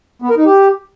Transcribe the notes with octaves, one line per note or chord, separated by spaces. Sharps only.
B3
A#4
D#4
G4